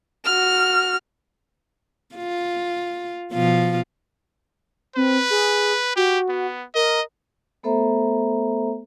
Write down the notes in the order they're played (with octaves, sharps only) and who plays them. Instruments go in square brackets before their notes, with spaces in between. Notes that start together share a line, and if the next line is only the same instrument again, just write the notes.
[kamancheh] F#4 F6
[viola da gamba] F4
B2 F3 F4
[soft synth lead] C4 [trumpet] B4
[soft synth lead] G#4
[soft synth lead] F#4 [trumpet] G4
[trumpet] B3
[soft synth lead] A#4 [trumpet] D#5
[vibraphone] A3 B3 A4 C5 E5 A#5